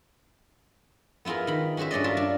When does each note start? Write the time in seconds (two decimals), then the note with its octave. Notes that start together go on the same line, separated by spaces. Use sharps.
1.25 B3 E4 F4 G#4 A#4
1.47 D#3 B5
1.77 C#4 F#4 G#4 C5 E5
1.91 G2 C#4 D5 D#5
2.04 F4 A#4 E5
2.17 D4